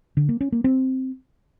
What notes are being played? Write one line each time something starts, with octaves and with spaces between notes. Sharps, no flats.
D3
A#3
C#4
A#3
C4